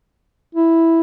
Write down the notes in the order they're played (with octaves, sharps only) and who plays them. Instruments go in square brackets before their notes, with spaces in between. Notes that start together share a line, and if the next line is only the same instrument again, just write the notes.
[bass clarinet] E4